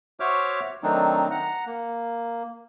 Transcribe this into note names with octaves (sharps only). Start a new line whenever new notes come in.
F#4 C5 C#5 E5 D6 F6
D#3 F#3 A3 C4 D4 D#4
F#5 A#5
A#3